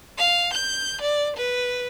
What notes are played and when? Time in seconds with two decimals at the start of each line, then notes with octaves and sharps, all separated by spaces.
0.18 F5
0.54 G6
1.01 D5
1.37 B4